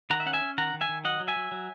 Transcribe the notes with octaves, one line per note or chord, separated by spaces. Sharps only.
D#3 F#5 A#5
E5
C#4 F#5
E5 G#5
C#4
D#3 F#5 A#5
D#3
E5 G#5
D#3
F#3 D#5 F#5
F#3
E5 G#5
F#3
F#3